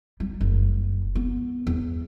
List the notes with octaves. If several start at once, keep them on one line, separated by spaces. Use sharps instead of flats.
G3
F#1
B3
E2